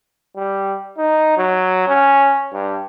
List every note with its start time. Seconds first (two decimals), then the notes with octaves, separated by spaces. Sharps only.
0.36 G3
0.98 D#4
1.37 F#3
1.88 C#4
2.53 G2